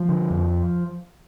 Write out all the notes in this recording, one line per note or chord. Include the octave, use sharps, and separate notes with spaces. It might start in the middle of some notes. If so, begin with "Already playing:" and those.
Already playing: F3
D3
F2